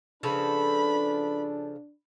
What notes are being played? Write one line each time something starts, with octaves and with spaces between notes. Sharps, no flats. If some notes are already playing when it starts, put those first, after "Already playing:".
C#3 F3 D4 A4 B4 B5